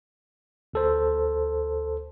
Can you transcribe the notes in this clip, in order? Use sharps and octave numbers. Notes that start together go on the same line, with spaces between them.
D2 A4 C5